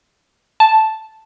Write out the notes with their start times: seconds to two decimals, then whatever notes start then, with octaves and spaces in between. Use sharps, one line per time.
0.60 A5